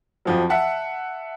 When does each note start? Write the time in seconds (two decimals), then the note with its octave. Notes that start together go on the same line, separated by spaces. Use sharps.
0.25 F2 F3 F#3
0.49 E5 F#5 A5